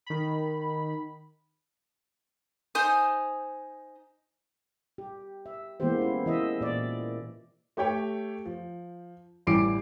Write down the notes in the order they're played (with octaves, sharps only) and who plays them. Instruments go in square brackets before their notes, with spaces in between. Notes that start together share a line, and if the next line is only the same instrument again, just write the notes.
[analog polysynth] D#3 B5
[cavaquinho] D#4 C5 G#5 D#6
[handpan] G4
E5
E3 G#3 A#3 B3 G4 C5
C#4 E4
E3 D#5 E5
A#2 D5
[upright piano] A3 G4 C#5 G5
F3
A1 E3 G3 D6 C7 D7